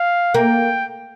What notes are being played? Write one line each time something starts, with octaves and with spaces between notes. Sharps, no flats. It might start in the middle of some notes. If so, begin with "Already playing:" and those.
Already playing: F5
A#3 G5